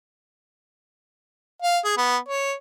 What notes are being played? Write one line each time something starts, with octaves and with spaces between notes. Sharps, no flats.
F5
G#4
B3
C#5